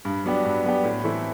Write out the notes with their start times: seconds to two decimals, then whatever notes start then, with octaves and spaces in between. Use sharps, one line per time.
0.05 G2
0.24 F#3 B3 D4 G4
0.45 G2
0.65 F#3 B3 D4 G4
0.84 A2
1.04 E3 A3 C4 E4